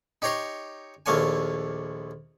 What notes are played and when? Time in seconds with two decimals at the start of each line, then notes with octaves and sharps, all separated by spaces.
0.22 D#4 G4 C#5 A#5 C6 C#6
1.06 A#1 D#2 A3 A#3 C#5 G#5